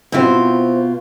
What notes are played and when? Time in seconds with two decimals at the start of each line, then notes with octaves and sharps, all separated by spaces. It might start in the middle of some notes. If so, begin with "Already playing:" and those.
0.12 B2 C4 E4 F4 C5